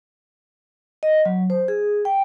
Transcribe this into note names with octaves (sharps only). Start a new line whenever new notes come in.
D#5
F#3
C5
G#4
G5